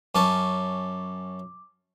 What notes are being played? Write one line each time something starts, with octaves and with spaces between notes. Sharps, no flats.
F#2 C#4 A5 D6